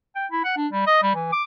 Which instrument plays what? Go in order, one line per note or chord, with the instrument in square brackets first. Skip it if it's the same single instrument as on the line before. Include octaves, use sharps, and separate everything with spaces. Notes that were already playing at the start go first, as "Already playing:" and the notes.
[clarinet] G5
E4
F#5
D4
G3
D#5
G3
E3
D6